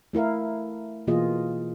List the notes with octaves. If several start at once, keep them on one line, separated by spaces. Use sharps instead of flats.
A3 E4 A#4 F5
B2 E3 A#3 F4 G#4 D#5